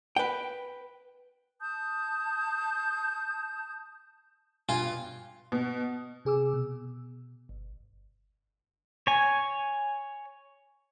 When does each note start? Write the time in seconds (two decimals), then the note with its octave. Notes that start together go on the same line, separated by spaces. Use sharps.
0.16 B4 G5
1.61 A5 D#6 G6
4.69 G2 B2 F4 G#5
5.52 B2
6.25 C3 G#4 D6 E6
6.54 B2
7.49 G1
9.07 C#5 G#5